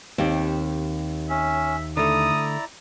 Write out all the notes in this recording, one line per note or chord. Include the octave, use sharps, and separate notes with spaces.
D#2 C4 G4
C#4 E5
D3 A3 E4 D5 A#5 D#6